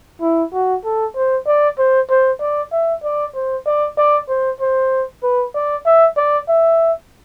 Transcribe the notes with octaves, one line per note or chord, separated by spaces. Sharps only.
E4
F#4
A4
C5
D5
C5
C5
D5
E5
D5
C5
D5
D5
C5
C5
B4
D5
E5
D5
E5